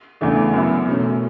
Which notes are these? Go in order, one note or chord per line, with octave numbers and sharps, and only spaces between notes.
E2 C#3 E3 A3 D4
F#2 E3 B3 E4
B2 A3 C#4